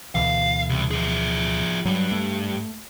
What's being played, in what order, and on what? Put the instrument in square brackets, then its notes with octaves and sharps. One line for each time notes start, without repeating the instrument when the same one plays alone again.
[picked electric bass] D2 B2 E3 [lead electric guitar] F5
[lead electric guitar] C2
F3 G#4
[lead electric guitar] G2 [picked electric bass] F#3
[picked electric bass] A3